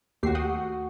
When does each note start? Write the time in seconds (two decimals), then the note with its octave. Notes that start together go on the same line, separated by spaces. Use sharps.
0.23 D#2 A3 F#4 G4 C7
0.35 F#5 G5 D#6